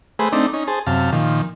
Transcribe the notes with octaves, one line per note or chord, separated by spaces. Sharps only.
A3 G#4 B4 C5
A3 C4 D4 D#4
C#4 D#4
G#4 C5 A5
F#2 C3 F5 A5
A#2 D#3 F3